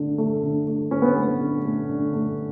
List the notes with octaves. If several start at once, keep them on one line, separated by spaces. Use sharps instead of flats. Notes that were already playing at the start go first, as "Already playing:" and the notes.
Already playing: D3 A3
A3
D3
A3
D3 C#4
B3
A3
B3
D3
A3
D3
A3